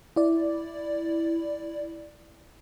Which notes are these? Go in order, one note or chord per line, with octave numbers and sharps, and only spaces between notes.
E4 D5